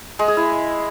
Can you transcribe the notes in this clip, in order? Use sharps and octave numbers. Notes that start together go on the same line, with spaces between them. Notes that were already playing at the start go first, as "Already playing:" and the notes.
G#3
G#4
E4